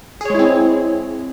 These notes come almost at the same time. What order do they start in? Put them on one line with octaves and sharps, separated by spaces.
G#4 C#5 G#3 E4 C4